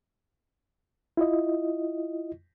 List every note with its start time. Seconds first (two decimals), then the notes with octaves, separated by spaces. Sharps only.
1.17 E4 F4 D#5